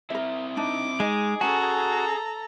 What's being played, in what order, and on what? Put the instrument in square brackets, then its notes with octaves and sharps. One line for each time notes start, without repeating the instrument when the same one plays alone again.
[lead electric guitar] C4 E4 [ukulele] A#4 E5
[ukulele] D4 D#4 [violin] D6
[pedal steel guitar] G#3 [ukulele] D#4 D#5 [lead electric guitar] G#4
[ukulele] C#4 G#5 [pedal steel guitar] F#4 [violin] A4 A#5